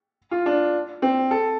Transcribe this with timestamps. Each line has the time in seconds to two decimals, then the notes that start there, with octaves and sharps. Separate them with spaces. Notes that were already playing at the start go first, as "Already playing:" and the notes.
0.31 F4
0.46 D4
1.02 C4
1.31 A4